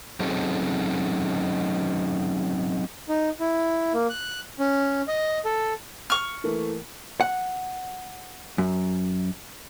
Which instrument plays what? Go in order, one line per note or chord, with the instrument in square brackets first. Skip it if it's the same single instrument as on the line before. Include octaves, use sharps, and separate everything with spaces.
[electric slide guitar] F#3 C4 C#4 D#4 G#4 A4
[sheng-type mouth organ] D#4
E4
A#3
F#6
C#4
D#5
A4
[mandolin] C#6 F6
[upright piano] E3 A3 A#3
[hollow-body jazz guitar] F#5
F#2